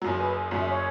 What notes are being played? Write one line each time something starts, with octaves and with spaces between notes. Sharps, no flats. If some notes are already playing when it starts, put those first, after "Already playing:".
F#1 F#2 F#3 C#5
B4
F#1 F#2 F#3 E5
C#5